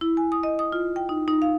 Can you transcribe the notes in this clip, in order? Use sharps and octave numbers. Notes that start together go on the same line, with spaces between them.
E4
G#5
D#6
D#5
D#6
F4
G5
D#4
D#4
F5